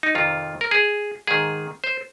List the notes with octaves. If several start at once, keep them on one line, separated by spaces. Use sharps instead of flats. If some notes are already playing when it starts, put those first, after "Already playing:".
D#4
F2 C3 D#3 F4
A#4
G#4
G#2 D#3 G#4
C5